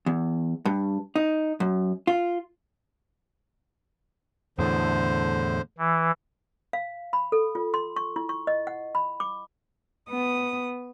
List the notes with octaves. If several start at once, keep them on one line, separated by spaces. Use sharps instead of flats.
E2
G2
D#4
F#2
F4
E2 A2 D3 C5
E3
F5
B5
A4
F4
C6
C#6
E4
C#6
D#5
F#5
B5
D6
B3 D#6